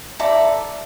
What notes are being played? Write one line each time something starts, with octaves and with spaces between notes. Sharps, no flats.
E4 A4 D5 A#5